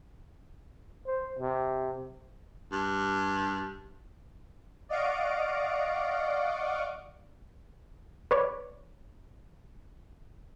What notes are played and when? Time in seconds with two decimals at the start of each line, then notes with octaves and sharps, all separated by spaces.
1.07 C5
1.39 C3
2.72 G2
4.89 D5 D#5 F5 F#5 C#6 D7
8.31 B4 C#5 D5